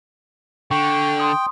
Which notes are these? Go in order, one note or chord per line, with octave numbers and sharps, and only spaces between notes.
D3 G5 C#6
C6 D#6